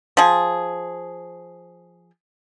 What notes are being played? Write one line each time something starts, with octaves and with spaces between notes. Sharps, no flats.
F3 G#4